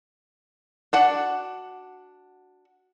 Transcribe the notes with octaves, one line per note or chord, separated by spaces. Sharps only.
D4 F#4 F#5